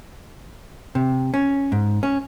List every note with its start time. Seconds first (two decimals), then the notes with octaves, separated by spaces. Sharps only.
0.95 C3
1.34 C#4
1.72 G#2
2.03 C#4